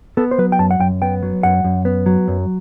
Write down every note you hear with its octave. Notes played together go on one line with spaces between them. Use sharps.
B3 A4
C5
F#3 B4
G5
F#2 A5
F#5
F#2 G5
B3 G5
F#3
F#2 F#5
F#2
B3
F#3
F#2